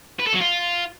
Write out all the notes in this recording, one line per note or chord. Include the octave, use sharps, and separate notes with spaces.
B4
A4
F#3
F4